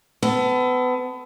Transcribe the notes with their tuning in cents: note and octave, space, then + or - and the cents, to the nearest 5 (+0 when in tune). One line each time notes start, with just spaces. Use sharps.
B3 +30 A4 +0